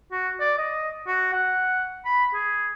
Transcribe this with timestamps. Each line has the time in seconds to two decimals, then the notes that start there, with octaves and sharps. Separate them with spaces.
0.12 F#4
0.40 D5
0.58 D#5
1.07 F#4
1.33 F#5
2.05 B5
2.34 G#4